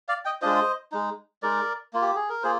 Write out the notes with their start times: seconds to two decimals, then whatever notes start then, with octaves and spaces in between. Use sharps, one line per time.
0.09 D5 F5
0.25 D#5 G5
0.42 G#3 D4 F4 C5 D#5
0.92 G#3 D#4
1.43 G#3 D#4 A#4 D5
1.93 A#3 F4
2.02 G4
2.16 G#4
2.29 A#4
2.43 A#3 F4 G#4 C5